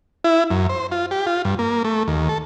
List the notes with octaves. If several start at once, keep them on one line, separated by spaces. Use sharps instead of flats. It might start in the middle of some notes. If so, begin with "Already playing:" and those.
E4
F#2
C5
F4
G4
F4
G2
A#3
A3
D#2
A4